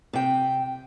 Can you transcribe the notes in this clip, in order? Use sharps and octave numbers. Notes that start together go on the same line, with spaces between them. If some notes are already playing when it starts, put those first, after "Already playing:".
C3 G5